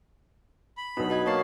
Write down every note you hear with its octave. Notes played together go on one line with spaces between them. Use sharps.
B5
B1 B2 D4 D#4
F#4 D#5 G#6
A#3 C#5 A5 C#6 C7